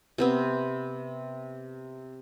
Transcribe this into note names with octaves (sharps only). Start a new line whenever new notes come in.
C3 B3 C4